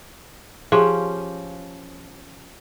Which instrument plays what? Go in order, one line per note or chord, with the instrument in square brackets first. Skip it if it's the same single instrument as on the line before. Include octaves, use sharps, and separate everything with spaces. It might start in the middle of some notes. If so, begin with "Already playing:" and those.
[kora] F3 C#4 G4 [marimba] G#4